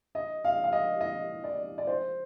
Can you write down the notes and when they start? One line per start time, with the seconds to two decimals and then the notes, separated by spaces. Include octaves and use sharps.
0.15 D#5
0.44 F5
0.64 F5
0.72 D#5
1.01 D#5
1.44 D5
1.78 D5
1.87 C5